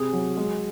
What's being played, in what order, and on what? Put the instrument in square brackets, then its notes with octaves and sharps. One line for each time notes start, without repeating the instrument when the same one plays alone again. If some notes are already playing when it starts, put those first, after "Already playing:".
Already playing: [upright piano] C3 [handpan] G#4
[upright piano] F#3
G#3